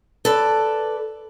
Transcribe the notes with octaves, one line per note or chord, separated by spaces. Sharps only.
A4 B4 D5